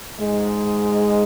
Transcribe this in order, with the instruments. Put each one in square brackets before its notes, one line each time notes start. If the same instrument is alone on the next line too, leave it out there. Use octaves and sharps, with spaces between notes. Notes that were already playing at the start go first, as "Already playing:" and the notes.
[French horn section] G#2 G#3